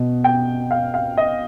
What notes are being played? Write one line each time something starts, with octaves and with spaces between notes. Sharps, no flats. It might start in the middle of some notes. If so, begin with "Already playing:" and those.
Already playing: B2
G5
F5
F5
D#5